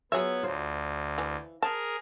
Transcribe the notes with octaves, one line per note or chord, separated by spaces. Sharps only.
F#3 B3 F4 G#4 E5 G#6
D2 F4 C5
E3
G#4 A#4 C5 A5